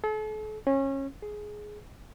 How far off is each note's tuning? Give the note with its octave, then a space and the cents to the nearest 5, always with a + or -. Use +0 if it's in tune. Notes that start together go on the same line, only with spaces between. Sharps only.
A4 -40
C#4 -25
G#4 +10